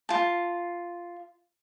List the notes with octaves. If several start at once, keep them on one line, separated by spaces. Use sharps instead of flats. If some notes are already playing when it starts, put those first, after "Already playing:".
F4 A5